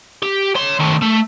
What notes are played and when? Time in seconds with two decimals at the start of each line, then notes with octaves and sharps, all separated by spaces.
0.23 G4
0.56 C#5 C6
0.80 D#3 A3
1.02 A3